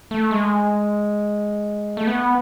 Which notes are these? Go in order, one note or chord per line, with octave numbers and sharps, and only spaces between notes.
A3
G#3
A3
B3